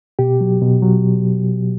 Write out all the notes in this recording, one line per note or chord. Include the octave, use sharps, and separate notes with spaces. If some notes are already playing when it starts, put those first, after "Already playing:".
B2 G4
F#3
B2
F#3